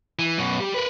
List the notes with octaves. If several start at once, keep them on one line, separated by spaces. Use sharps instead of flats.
E3
F#2 B2
G3 G4
A#4 B4